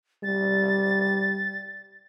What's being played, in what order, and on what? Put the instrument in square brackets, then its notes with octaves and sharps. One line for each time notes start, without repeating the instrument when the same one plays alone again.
[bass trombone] G3 [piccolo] A6